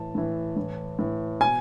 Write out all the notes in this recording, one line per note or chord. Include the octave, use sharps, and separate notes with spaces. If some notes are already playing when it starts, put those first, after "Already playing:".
Already playing: A2 E3 A5
A2 E3
A2 E3
A2 E3
B2 G#5